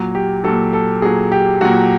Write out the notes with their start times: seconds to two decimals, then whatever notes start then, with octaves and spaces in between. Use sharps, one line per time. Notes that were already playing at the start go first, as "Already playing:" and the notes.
Already playing: A#2 F#3
0.15 G4
0.44 A#2 F#3 A4
0.73 A4
1.02 A#2 F#3 G#4
1.32 G4
1.61 A#2 F#3 F#4